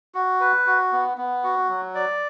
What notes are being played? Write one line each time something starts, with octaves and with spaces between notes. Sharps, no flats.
F#4
B4
F#4
B3
B3
F#4
F#3
D5